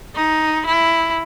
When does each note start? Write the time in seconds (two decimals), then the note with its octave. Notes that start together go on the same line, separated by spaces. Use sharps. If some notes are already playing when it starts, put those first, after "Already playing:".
0.16 D#4
0.66 E4